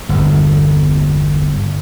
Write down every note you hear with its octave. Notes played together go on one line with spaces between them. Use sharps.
G1 E2